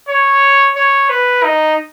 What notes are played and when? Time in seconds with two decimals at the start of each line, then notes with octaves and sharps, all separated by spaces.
0.08 C#5
0.76 C#5
1.09 B4
1.43 D#4